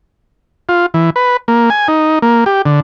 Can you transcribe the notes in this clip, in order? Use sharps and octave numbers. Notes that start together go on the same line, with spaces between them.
F4
E3
B4
A#3
G#5
D#4
A#3
G4
D3